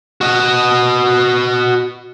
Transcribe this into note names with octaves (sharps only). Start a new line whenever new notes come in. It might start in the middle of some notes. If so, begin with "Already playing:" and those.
F#4 D#5